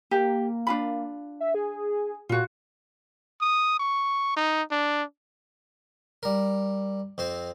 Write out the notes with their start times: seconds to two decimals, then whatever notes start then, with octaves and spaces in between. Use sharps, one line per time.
0.11 A#3 G4
0.67 D4 F4 B5
1.40 E5
1.54 G#4
2.29 A#2 F4 F#4
3.41 D#6
3.79 C#6
4.37 D#4
4.72 D4
6.23 G3 A#4
7.18 F2 C4 C5